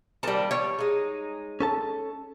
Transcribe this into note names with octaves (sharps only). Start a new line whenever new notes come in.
D#3 G3 A#3 C4 A5
F3 G3 B3 C#5
G#3 D#4
C#4 A4 A5